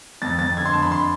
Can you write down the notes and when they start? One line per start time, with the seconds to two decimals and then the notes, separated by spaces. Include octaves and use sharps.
0.22 F2 A6
0.39 F2 A6
0.57 D3 G#6
0.65 C6
0.73 F2 A5
0.83 B5
0.92 C6